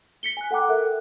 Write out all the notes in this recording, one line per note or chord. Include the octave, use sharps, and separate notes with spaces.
B6 C#7 G7
G#5 F#6
A4 F#5 G5 A#5 D6 F#6
A4 A#4 E5 F#6